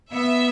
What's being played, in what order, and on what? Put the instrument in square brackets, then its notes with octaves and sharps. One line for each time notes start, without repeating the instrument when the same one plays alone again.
[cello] B3 [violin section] E5